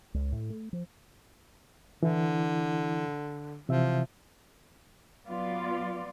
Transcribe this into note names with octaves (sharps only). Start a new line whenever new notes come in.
C#2
A2
A3
F3
D3 E3 E4
C3 E3 F3 E5
F#3 B3 F4 D5